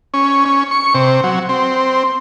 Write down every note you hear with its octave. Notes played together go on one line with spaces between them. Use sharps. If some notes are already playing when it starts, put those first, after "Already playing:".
C#4
C#4
C#6
C3
F#3
C4